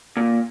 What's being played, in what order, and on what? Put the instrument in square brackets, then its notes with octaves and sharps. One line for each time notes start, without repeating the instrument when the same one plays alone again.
[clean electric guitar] A#2